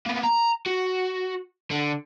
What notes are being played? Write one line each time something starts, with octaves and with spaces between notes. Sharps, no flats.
A#3 B3
A#5
F#4
D3